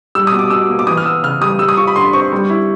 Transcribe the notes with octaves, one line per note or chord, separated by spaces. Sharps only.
G3 E6
D#6
B2
D6
B2 E6
A#3
D6
E3 D#6
F6
B3 E6
C#3 F6
G3 D#6
G3 E6
D#6
F4 C#6
B5
D3 C6
C4 C#6
G3
E4